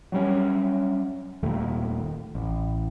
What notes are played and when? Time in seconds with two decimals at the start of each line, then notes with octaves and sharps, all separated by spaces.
0.12 F#3 G3 C#4
1.43 D#1 D#2 A3
2.35 A1